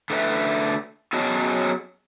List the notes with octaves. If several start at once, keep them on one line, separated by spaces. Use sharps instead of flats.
D3 A3 B4 E5
F#3 B3 C#4 G#4 D#5 A5